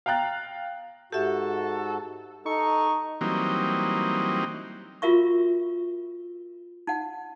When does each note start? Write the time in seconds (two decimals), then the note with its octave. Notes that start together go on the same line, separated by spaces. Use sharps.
0.06 F5 G5 A#5 F#6 A6
1.13 G#2 F#4 G4 A4 E5
2.46 D#4 A4 C#6
3.21 E3 F#3 G3 A#3 C4 D#4
5.02 F4 F#4 A#4 E5 C#6
6.87 D#4 F#5